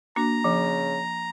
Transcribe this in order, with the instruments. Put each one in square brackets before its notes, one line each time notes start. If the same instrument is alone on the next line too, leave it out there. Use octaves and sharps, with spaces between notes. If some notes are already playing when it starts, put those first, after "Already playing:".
[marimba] A#3 D4 F#4 [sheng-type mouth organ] A#5
[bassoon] C#3 [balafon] F3